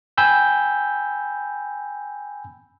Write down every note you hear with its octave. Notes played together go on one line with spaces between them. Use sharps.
G5 G#5 B5 E6 G6